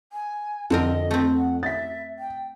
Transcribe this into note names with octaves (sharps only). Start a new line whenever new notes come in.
G#5
F2 D3 C4 A#4 D#5
A3 C4
F#5
E5 A6 B6
G5